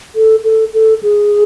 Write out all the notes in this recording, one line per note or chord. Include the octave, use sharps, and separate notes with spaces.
A4
A4
A4
G#4